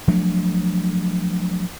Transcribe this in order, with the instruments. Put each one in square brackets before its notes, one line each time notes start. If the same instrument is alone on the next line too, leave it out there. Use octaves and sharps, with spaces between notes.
[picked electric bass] F3 F#3 A3 D4